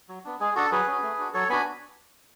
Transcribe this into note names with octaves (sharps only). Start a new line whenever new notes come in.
F#3
B3 D4
G#3 G#4
D4 F#4 A4
F#3 G#4 B4
C#4 F#4
A3
D4 F#4
F#3 A4 C#5
B3 D4 F#4 G#5 B5